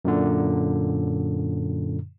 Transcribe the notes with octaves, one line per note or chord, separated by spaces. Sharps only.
F#2 A#2 D3